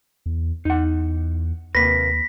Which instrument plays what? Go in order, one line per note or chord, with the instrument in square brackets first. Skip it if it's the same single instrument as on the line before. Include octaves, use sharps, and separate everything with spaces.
[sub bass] E2
[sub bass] E2 [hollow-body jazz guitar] D#4 F#5
[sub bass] D#2 [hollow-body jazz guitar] C3 A#3 B4 [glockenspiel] A#6 B6